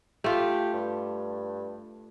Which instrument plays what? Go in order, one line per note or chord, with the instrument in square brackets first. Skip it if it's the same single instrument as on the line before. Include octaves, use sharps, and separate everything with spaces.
[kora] A3 F4 [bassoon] G4
[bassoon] G2